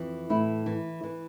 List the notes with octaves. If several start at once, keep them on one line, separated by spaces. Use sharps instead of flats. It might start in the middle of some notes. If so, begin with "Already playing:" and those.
Already playing: F2 E3
A2 E4
E3
E3